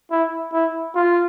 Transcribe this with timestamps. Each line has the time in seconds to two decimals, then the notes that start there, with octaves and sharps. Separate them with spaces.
0.11 E4
0.53 E4
0.95 F4